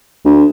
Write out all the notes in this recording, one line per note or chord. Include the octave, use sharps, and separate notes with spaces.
D2